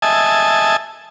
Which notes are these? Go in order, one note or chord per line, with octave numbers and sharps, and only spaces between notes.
D#5 E5 G#5 A5